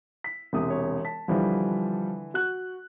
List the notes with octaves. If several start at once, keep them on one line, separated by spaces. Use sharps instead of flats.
B6
E1 C3 D#6
C#5
A5 B6
D3 E3 F3 G3
F#4 F#6